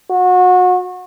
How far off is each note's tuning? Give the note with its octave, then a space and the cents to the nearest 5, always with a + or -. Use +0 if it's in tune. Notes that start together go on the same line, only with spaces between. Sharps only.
F#4 -30